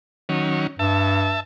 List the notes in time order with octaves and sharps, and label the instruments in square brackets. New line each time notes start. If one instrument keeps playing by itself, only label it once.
[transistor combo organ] D#3 F#3 C#4
[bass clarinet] G2 [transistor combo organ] E5 A5